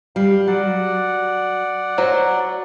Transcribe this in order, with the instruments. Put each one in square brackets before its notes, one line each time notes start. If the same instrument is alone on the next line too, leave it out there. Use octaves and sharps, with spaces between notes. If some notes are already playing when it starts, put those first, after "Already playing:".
[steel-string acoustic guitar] G3 [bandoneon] F5
[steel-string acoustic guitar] F#3 [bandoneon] D5 F#5
[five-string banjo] F#3 [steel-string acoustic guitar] C5